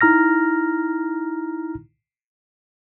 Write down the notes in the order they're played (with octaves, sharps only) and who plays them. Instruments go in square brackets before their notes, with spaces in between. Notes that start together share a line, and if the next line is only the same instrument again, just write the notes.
[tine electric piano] D#4 E4 A#5 F6 A#6